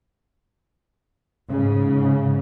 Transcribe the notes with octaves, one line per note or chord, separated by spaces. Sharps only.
G#2 C#3